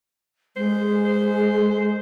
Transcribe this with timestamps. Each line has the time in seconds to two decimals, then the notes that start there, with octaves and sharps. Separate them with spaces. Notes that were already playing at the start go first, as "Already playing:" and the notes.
0.56 G#3 C5
1.05 C5